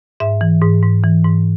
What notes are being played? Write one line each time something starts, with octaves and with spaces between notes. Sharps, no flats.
G#2 E5
E3
G#2
G#2
E3
G#2